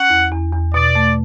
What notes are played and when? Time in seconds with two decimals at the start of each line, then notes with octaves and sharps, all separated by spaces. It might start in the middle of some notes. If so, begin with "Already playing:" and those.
Already playing: C#4 F#5
0.10 E2
0.32 E2
0.53 E2
0.74 B2 D5
0.95 A3